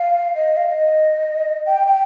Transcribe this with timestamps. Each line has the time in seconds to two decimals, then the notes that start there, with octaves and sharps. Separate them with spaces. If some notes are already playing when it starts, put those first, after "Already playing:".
Already playing: F5
0.35 D#5
0.57 F5
0.68 D#5
1.66 G5
1.87 G5